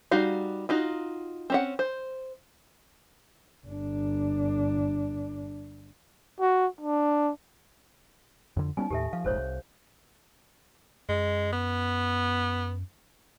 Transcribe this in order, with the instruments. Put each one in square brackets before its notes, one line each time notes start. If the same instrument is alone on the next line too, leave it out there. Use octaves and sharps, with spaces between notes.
[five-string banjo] G3 D#4 F#4 F5
D#4 F4 F#4
C4 C#4 F#5
C5
[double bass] G1 D4
[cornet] F#4
D4
[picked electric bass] F2 D3
[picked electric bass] G3 B3 C#4 [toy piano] D#4 G#5
[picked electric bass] D#2 A2 [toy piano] G4 A4 E5
[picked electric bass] F3 [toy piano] F5
[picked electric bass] F1 A#1 G#2 [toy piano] A4 C5 C#5
[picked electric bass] C2
[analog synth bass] F#2 [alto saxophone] G#3
[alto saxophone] B3